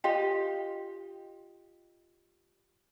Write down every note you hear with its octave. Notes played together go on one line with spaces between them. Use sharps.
F4 G4 D#5